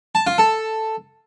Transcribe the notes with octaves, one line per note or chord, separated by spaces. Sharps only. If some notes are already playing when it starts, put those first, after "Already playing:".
A5
F4
A4